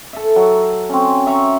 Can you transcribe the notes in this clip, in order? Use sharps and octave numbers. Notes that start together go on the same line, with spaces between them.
A4 E5
F#3
C4 C#4
E5 A#5 C#6